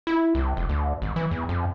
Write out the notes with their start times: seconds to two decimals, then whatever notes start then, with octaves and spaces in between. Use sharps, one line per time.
0.07 E4
0.35 C2
0.57 F1
0.69 D2
1.02 G#1
1.16 E3
1.31 E2
1.49 F2